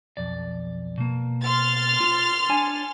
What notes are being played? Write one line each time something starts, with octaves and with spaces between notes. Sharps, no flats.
B1 F2 D5
B2 A#3
C6 F6 A6
F4
D4 C#5 G#5